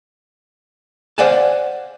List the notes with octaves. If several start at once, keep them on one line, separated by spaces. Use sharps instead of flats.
C5 D5 F5 F#5 G#5 A5